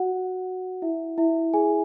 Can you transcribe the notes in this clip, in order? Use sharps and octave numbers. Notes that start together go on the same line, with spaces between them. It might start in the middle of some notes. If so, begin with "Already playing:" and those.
Already playing: F#4 F#5
E4 E5
E4 E5
G#4 G#5